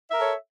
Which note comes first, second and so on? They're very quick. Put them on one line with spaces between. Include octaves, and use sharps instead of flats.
E5 A#4 A4 C#5